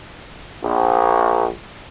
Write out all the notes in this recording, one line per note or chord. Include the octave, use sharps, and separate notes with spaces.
A#1